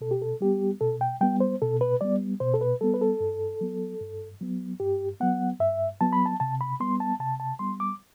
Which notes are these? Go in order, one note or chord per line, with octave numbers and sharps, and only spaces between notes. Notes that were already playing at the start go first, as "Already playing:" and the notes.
B2 A4
G4
A4
G3 B3 G4
B2 A4
G5
G3 B3 G5
C5
B2 A4
B4
G3 B3 D5
B2 C5
A4
B4
G3 B3 A4
B4
A4
G2
F#3 B3
G2
F#3 B3
G2 G4
F#3 B3 F#5
G2 E5
F#3 B3 A5
B5
A5
C3 A5
B5
G3 B3 C6
A5
C3 A5
A5
G3 B3 C6
D6